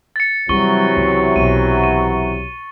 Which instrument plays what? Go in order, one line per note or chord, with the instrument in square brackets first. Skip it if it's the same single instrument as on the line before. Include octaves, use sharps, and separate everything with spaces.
[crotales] A6 C#7
[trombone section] C3 E3 F#3 [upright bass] G3 [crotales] C#6 G7
[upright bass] C#2
[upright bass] B1 [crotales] D#7
[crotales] D#7